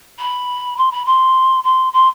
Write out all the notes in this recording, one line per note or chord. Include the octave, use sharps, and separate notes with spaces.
B5
C6
B5
C6
C6
C6